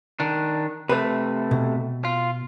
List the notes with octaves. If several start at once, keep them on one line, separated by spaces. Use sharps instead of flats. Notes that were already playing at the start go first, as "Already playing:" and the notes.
D#3 D4
C3 A3 B4
B2
F4